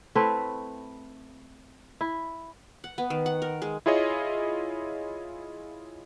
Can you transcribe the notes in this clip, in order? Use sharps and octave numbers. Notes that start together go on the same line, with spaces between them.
A3 C4 E4 B4
E4
F#5
B3
D#3
F#5
A#4
G#3
E4 F4 G#4 C#5 D#5